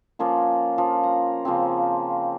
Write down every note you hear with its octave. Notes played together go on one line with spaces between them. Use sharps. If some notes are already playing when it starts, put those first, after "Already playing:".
F3 A#3 C#4 F4
F3
A#5
C#3 F3 A#3 C4